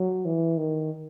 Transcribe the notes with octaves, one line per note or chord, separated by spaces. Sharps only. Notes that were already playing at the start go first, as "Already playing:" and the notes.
Already playing: F#3
E3
D#3